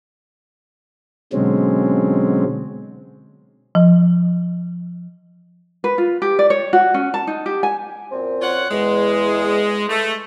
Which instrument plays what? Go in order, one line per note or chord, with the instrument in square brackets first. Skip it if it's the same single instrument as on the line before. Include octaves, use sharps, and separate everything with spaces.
[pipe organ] B2 D3 F#3 G#3 C4 C#4
[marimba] F3
[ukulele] B4
F4
G4
D5
C#5
F#4
C#4
A5
D#4
G4
G#5
[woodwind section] F#2 A#2 C4
[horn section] F4 C#5 F#5
[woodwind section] E2 [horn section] G#3
[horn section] A3